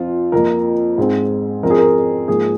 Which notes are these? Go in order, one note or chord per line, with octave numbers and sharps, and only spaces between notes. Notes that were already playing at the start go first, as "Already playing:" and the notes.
Already playing: F2 F3 C4 F4
F2 F3 A#3 A#4
G#2 G#3 C4
F2 F3 C4 A#4
G#4
A#4
G#2 F3 A#3 G#4